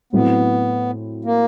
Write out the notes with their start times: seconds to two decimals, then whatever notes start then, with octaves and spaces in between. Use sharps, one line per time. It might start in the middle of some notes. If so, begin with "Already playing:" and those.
0.13 A2 F#3 A3 B3 C4 E4
1.25 A#3